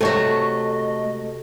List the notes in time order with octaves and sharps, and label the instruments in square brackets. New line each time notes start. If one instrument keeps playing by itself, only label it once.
[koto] C3 F#4 [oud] A3 C#5 [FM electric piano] A4 [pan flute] D#5